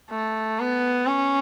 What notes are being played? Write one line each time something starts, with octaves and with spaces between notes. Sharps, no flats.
A3
B3
C#4